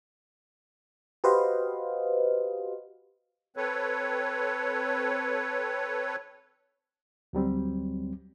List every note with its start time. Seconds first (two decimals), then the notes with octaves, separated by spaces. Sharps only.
1.24 F#4 G4 B4 C5 D#5 F5
3.57 C4 A4 B4 C#5
7.33 D2 F#3 G3 C4